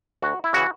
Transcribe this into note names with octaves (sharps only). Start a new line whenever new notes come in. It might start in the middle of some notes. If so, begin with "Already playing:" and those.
D2 F#4
E4
C#3 E3 F#4